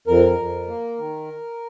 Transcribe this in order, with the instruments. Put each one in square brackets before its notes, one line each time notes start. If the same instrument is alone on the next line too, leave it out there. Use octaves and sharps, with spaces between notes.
[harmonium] F2 A#4
F2
A#3
D#3